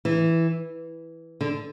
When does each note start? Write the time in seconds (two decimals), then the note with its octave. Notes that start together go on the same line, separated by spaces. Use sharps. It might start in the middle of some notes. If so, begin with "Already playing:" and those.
0.05 E3
1.41 D3